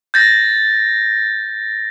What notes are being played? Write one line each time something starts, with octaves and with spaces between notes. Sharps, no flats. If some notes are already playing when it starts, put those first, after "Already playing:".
G6 A6 A#6